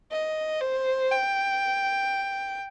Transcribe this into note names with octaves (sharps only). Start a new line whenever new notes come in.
D#5
C5
G5